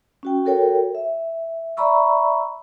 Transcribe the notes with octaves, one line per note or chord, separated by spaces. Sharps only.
C#4 F#4 G5
F#4 A4 A#4 C#5 G5
E5
D5 E5 A#5 B5 C#6 E6